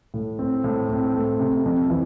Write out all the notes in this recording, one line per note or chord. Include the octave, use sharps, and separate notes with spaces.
A2
C4
A2
C4
A3
C3
F2
E3